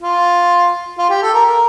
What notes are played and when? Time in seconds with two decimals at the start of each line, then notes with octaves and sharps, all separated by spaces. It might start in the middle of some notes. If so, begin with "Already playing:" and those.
0.02 F4
0.99 F4
1.10 G4
1.22 A4
1.34 A#4
1.46 A#4